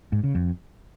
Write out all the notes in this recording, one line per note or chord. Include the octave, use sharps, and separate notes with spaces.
G#2
C#3
F2